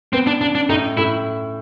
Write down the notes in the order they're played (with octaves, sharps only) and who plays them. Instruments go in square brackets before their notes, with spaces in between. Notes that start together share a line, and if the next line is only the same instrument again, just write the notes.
[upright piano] B3 [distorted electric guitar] C4
[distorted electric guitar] D4
[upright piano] C#3 [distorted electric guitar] D4
[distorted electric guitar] D4
[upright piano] A2 [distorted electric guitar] D#4
[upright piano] A2 [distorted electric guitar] E4